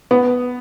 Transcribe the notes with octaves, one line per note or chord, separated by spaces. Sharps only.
B3